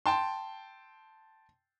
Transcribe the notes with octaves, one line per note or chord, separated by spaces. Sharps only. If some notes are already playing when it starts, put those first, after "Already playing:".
G5 A5 C6